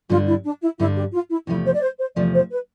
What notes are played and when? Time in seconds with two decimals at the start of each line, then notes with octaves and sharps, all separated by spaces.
0.09 G2 D3 G3 D4 F4
0.27 E4
0.44 D4
0.62 E4
0.79 G2 D3 G3 D4 E4
0.96 G4
1.13 F4
1.30 E4
1.47 E2 C3 F3 A3 E4
1.65 C5
1.74 D5
1.82 C5
1.99 C5
2.16 E2 C3 F3 A3 D5
2.34 C5
2.51 B4